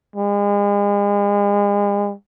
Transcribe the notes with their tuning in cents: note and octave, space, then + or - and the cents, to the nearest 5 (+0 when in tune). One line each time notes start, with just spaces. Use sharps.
G#3 -40